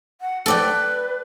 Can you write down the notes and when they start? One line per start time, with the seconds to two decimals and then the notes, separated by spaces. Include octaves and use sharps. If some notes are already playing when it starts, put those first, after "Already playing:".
0.21 F#5
0.46 A4 B4 D5 G5